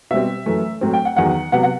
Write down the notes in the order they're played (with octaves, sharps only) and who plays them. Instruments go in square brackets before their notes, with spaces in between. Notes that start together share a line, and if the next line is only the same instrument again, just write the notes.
[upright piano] B2 G3 C4 E5
F#2 E3 A3
A2 F#3 C4
G5
F#5
E2 D#3 F#3 B3 F#5
C3 F#3 B3 F#5
F#5